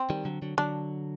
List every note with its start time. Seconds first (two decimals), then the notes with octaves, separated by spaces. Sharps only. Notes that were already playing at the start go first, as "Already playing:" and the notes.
Already playing: C4
0.10 D#3 G3
0.25 D3 F#3
0.42 D3 F#3
0.58 D3 F#3 D4